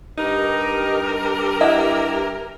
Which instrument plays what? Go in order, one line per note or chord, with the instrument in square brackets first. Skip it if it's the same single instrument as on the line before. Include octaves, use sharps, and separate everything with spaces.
[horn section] G2 G4 A#4 [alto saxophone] D#4
[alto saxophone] E4 [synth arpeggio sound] D#5 F#5